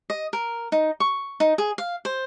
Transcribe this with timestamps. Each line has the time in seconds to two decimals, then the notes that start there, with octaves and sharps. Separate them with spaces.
0.10 D#5
0.33 A#4
0.72 D#4
1.00 C#6
1.40 D#4
1.58 G#4
1.78 F5
2.05 C5